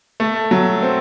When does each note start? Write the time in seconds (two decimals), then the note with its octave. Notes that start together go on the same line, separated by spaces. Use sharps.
0.20 A3
0.51 F#3
0.83 C4